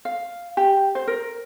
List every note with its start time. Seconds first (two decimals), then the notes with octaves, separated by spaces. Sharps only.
0.05 F5
0.57 G4
0.95 C5
1.08 A#4